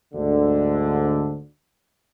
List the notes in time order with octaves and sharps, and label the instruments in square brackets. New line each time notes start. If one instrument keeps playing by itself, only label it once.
[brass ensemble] D2 G#2 D3